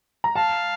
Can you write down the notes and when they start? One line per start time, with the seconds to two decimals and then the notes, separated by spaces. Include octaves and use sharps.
0.24 A#5
0.36 F5 A5